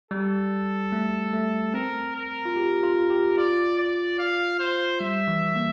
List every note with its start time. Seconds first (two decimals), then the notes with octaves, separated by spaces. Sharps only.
0.11 G3 A4
0.92 A3
1.33 A3
1.74 C4 A#4
2.15 A#4
2.45 F4
2.56 G4
2.83 F4
3.10 G4
3.37 F4 D5
3.78 D5
4.19 F5
4.60 C5
5.00 G3 E5
5.28 E3
5.56 A#3